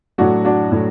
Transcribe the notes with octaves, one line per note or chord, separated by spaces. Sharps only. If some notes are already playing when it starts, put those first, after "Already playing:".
A2 F#3 D4 F#4
D4 F#4
A2 F#3